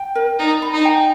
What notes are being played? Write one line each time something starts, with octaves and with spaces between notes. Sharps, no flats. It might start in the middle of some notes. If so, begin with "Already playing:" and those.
Already playing: G5
A#4
D#4 D5
B5
D#4
G5